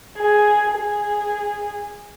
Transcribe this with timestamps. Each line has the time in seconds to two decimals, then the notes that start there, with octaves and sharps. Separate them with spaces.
0.18 G#4
0.74 G#4